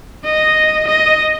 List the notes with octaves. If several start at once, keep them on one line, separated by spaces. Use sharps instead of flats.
D#5
D#5